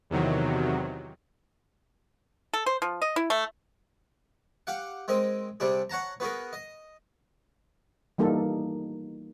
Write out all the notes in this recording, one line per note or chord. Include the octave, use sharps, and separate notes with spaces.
E2 C3 D#3 F#3
A4
C5
F3
D#5
E4
A3
G4 F5 F#5
G#3 C4 A#4 D#5
C3 G3 D4 G#4
C#5 F#5 A5 A#5
B3 F#4 G#4 A#4
D#5
E3 G3 A#3 D#4 A4